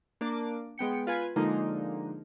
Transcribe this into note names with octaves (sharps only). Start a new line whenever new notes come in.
A#3 D4 D6
G#3 B3 G5 C#7
F4 B4 G#5
D3 F3 G#3 A#3 D#4